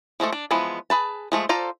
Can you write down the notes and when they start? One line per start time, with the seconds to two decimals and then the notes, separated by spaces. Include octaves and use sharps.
0.20 F3 G#3 A3 A4
0.32 D4
0.51 E3 F3 G#3 B3
0.90 G#4 B4 A5
1.32 F3 G#3 A3
1.49 F4 A4 C5 D5 A#5